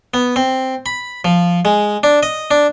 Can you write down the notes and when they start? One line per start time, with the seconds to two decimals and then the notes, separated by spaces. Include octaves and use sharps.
0.14 B3
0.36 C4
0.86 B5
1.25 F3
1.65 G#3
2.03 D4
2.23 D#5
2.51 D4